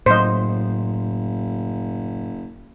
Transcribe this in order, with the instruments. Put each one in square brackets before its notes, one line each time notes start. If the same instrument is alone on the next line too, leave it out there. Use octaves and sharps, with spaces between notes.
[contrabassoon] F#1 [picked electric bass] A2 F#3 [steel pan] C5 D#5